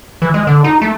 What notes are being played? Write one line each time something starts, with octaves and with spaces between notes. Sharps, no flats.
E3
G#3
D3
D#4
A3